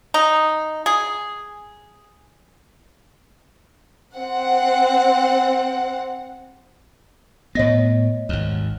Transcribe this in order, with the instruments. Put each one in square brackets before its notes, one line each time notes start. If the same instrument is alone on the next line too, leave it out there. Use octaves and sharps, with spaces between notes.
[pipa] D#4
G#4
[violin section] C4 F#5
[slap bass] A2 B3 [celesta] C#5 D#5 A#6
[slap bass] G#1 D#2